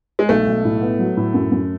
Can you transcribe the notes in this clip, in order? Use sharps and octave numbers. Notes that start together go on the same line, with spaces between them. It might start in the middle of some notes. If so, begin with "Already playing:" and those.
G#3
B1 A3
B1
A2
B3
F#3
A2
F#2
F#2